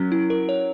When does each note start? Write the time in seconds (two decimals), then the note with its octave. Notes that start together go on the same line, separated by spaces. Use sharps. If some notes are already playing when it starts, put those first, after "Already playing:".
Already playing: F#3 C#4 A#4
0.12 E4
0.30 A#4
0.49 C#5